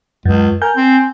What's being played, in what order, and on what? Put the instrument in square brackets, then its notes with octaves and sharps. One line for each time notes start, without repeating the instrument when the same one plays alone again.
[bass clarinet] C#2 [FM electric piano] F#2
[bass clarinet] A#4 [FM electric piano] G#5 G6
[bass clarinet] C4